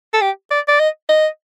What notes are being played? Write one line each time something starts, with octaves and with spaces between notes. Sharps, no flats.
A4
G4
D5
D5
D#5
D#5